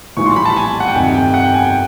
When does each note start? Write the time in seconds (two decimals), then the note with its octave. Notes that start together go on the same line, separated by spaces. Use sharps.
0.17 A#1 A2 E3 G3 C#6
0.26 C6
0.36 B5
0.45 A5
0.56 G#5
0.80 F#5
0.87 G5
0.95 G1 F2 C3 D#3 G3 G#5
1.14 G5
1.34 F#5
1.44 G5
1.54 G#5
1.64 G5